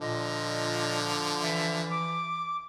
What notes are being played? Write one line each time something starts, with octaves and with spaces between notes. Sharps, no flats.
A#2 D3 F3 D#5
E3 E5
D6